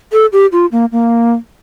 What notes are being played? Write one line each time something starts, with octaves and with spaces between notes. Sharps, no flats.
A4
G4
F4
A#3
A#3